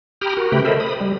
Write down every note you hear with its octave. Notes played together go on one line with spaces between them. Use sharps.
G4 G5 A#5 B5 D#6 F6
F#4 A#4
C#3 A3 G4 B4 G5 B5
A4 A#4 C5 D#5 E5 B5
B5 D#6
G3